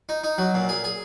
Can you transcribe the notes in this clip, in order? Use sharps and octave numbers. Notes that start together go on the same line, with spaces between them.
D#4
D#4
F#3
A#2
G#4
G#4